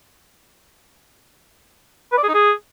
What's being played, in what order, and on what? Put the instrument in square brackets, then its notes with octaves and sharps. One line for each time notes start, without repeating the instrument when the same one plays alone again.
[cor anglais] B4
D5
G#4
D#4
G#4